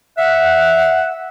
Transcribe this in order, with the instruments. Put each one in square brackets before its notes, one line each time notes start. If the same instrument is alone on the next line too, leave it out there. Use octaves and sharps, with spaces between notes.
[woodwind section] E5 F#5